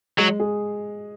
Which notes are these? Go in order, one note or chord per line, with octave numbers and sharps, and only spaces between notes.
F#3 G#3
G#4